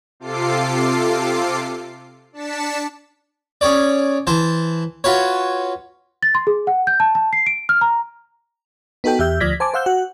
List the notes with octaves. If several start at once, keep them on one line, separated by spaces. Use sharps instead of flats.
C3 F4 A4 D6 C7
D4 A5 B6 C#7 E7
C#4 G#4 C#5 D5
E3 C5 A5
F4 F#4 B4 C#5
A6
C6
G#4
F#5
G6
A5
A5
C7
D7
F6
A#5
B3 D#4 F#4 A4 G5
E2 G4 E5 G6
D2 F3 D5 G#6 A#6 B6
C5 G#5 A5 D6
C5 F5 F#5 E6 G6
F#4 F#5